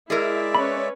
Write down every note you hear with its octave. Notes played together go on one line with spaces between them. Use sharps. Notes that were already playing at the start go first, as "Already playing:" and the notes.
G#3 E4 G#4 A#4 D5 E5
C#4 B4 C#5 B5